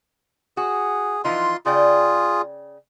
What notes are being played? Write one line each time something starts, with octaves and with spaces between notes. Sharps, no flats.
F#4 G#4
E3 F3 D#4 F4 C6
C#3 F4 G#4 D5 G5